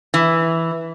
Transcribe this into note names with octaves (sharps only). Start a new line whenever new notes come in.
E3